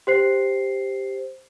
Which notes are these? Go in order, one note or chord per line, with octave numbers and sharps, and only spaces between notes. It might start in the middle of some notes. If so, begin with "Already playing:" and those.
G4 C5 C7